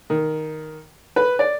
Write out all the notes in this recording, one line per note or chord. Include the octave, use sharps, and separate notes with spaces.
D#3
B4
D5